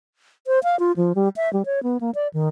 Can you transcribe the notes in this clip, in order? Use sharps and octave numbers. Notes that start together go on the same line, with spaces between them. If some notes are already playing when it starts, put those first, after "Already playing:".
C5
F5
F4
F3
G3
E5
G3
C#5
B3
A#3
D5
D#3